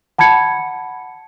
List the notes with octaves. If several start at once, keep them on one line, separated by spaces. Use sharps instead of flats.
F#5 A5 B5 G#6 C#7